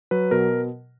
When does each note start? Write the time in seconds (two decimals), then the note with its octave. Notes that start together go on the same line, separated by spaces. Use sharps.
0.11 F#3 B4
0.31 B2 A#4